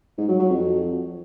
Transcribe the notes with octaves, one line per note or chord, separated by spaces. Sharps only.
G#2
F#3
F#3
F2